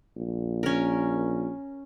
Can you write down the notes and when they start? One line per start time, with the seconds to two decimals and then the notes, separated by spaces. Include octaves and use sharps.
0.16 A#1
0.63 C#4 A#4